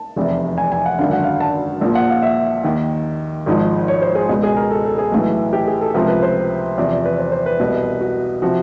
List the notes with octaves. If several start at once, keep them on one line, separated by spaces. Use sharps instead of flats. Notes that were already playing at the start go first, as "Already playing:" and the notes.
Already playing: A5
F1 E2 C3
G#5
G#5
F#5
G#1 F#2 D3 F5
F#5
F5
A5
A#1 A#2 F3
F#5
F5
E5
D#2 D#3
G#1 G#2 F3
C#5
C5
G#4
C#2 B2
G#4
A#4
A4
A4
G#4
B1 A2 E3
G4
G#4
A4
C#2 C3 F3 A#4
B4
C5
E2 C3 F3 D5
B4
C5
C5
B4
C2 B2
F#4
C3 F3 F#4